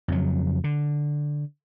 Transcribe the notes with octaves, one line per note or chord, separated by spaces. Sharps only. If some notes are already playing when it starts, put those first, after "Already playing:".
F2 C#3 F#3
D3